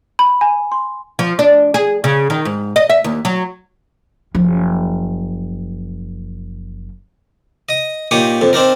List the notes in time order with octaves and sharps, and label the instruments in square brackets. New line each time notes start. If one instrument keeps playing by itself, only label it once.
[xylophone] B5
G#5
C6
[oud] F3
D4
G#4
C#3
D#3
G#2
D#5
E5
D#2
F#3
[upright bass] F#1 F3
[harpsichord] D#5 D#6
A#2 D#4 G4 C#5 D#6
F2 D3
C4 D4 D#4 A#4